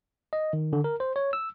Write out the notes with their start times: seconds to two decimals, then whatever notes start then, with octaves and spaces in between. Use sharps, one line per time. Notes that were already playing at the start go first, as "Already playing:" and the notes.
0.33 D#5
0.53 D#3
0.73 D3
0.84 A#4
1.00 C5
1.16 C#5
1.33 E6